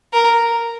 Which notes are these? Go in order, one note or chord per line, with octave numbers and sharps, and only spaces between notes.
A#4